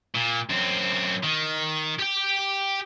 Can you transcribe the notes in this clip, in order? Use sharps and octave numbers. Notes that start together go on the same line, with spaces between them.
A#2
F#2 C4
D#3
G4 G5